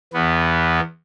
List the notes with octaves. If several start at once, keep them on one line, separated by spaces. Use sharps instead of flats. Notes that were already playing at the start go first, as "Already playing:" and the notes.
E2 B3